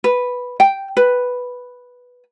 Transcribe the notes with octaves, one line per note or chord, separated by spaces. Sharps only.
B4
G5
B4